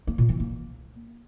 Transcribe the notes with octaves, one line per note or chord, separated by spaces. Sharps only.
A#3
A#2
E3
A#3